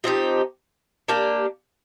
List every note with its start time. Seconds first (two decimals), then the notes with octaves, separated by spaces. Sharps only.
0.04 F3 C4 D#4 G4
1.08 A#3 D4 G4